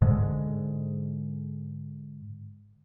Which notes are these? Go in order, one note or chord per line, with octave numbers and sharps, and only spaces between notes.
G#2 D3 G#3